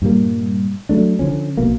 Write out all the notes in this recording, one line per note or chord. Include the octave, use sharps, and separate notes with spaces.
G2 A#2 G3 A#3
F#3 A3 D4
D3 E3 F3 C#4
A#1 B2 A#3